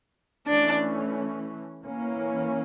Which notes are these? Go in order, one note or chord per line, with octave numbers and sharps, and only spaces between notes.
E3 A3 C#4 D4
E3 A#3 C#4